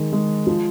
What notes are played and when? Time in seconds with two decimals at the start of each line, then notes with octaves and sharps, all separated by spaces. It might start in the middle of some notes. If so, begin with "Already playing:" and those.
Already playing: D#3 G#3
0.13 G#3
0.47 F3